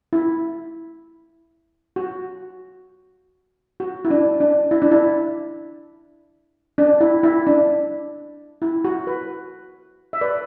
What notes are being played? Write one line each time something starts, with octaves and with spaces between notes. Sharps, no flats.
E4
F#4
F#4
E4
D4
D4
E4
D4
E4
D4
E4
E4
D4
E4
F#4
B4
E5
B4 D5